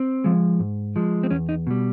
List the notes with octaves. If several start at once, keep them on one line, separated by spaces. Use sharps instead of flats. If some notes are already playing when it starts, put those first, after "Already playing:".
Already playing: C4
F3 G#3
G#2
F3 G#3
C4
E2 C#4
D#4
B2 G3